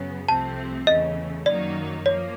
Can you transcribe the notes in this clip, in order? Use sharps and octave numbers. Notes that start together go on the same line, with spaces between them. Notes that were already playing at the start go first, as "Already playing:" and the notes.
Already playing: F#2 C#3 F#3 B3
C2 C3 F3 A3 C4 A5
E2 C#3 E3 A3 D#5
F#2 D#3 F#3 A#3 D#4 D5
F3 A#3 C#5